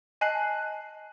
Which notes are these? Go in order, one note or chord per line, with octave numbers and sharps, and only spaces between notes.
D#5 G#5 A5 F#6 C7 F#7